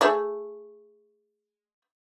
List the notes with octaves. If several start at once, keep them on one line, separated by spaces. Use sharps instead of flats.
A3 G#4 E5